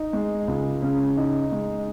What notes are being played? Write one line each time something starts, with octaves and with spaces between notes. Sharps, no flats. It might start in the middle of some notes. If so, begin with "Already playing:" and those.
Already playing: D#4
G#3
C#2
C#3
D#4
G#3